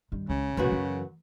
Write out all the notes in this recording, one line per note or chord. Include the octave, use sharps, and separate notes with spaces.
G2 D#3
C#2 C#3
F1 F#2 A#2 B3 F#4
E3